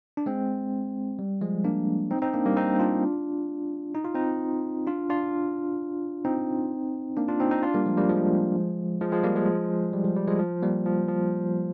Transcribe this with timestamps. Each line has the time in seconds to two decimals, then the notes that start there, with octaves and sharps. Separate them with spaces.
0.17 D4
0.26 G#3 C4
1.19 G3
1.42 F3 G#3
1.64 A#3 D4
2.11 C4 D#4
2.22 C4 D#4
2.34 A#3 D4
2.46 G3 A#3
2.57 C4 D#4
2.79 D4 F4
3.95 D#4
4.04 F4
4.15 C4 D#4
4.87 D4 F4
5.09 D4 F4
6.25 C4 D#4
7.17 A#3 D4
7.28 D4 F4
7.40 C4 D#4
7.51 C4 D#4
7.62 D4 F4
7.74 G3 A#3
7.85 F3 G#3
7.97 G3 A#3
8.09 F3 G#3
9.01 F3 G#3
9.12 F3 G#3
9.24 G3 A#3
9.35 F3 G#3
9.93 G3
10.04 F3
10.16 G3
10.27 F3 G#3
10.39 F3
10.63 G3 A#3
10.86 F3
11.08 F3